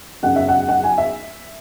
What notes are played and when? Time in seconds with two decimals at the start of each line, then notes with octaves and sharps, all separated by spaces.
0.23 F#2 C#3 F#3 F#5
0.36 E5
0.48 F#5
0.69 F#5
0.83 G#5
0.98 E5